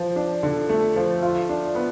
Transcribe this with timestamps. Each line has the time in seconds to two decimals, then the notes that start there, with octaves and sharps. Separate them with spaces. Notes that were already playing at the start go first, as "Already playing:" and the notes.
Already playing: F3
0.16 D4
0.43 D3
0.69 A3
0.96 F3
1.22 F4
1.49 D4
1.75 B3